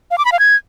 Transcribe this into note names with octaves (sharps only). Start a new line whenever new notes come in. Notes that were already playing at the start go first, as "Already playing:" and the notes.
F5
D6
B5
F5
G#6